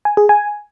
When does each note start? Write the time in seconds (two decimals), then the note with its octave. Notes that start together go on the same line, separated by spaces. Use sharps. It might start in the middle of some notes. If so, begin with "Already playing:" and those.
0.05 G#5
0.17 G#4
0.29 G#5